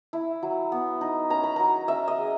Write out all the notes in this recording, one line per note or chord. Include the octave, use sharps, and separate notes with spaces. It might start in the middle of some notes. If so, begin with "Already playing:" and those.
E4
F#3
B3
D#4
C#4 A#5
B5
F#3 A#5
C#4 E5
D#5
G#3